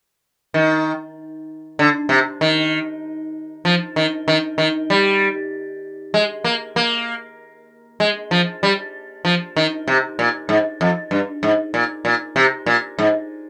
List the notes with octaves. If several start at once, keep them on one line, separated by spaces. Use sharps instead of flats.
D#3
D3
C3
D#3
F3
D#3
D#3
D#3
G3
G#3
A#3
A#3
G#3
F3
G3
F3
D#3
C3
A#2
G#2
F2
G2
G#2
A#2
A#2
C3
A#2
G#2